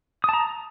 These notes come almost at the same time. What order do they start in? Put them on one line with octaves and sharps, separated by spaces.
D#6 A5 A#5